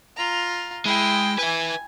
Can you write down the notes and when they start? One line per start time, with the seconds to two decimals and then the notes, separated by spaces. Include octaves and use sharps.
0.16 F4 A#5
0.85 G#3 E4 G5
1.39 B4 E5 G#5